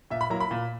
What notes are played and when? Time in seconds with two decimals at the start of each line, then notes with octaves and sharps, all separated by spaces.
0.11 A#2 E5
0.21 B5
0.30 F#3 A#3 E4 A#5
0.40 B5
0.51 A#2